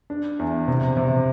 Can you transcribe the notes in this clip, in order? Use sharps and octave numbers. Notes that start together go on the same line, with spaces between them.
D4
E2
C3
C3